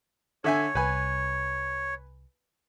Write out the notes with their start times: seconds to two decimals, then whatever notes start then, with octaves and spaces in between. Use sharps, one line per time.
0.44 D3 C#5 E5 G#5
0.75 C2 B4 G#5